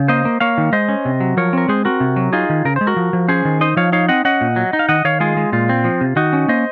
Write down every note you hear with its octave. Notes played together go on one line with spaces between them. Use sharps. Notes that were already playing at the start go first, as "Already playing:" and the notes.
Already playing: C#3
A#3 C5 D#5
A#3
A#3 C#5 F5
D#3
G#3 C5 D#5
C#4
C3
F#3
F3 A#4 C#5
C4 A#4
G#3 G#4 C5
C4 F#4 A#4
C3
F#3
D#4 F4 G#4
D#3
C#3 A#4
G#3 C5
F#4 A#4
F3
F3
C#4 G#4 C5
D#3
D#4 C5 D#5
F3 C#5 F5
D#4 C#5 F5
C4 D#5 F#5
C#4 D#5 F#5
A#2
F#3
D#4
F5
D#3 D#5 F#5
D#3 C#5 F5
G#3 F4 G#4
G#3
A#2 F4
C4
F3
C3
D#3 D#4 F#4
C#4
A#3 C5 D#5